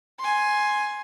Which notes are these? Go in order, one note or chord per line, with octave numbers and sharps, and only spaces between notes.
G#5 C6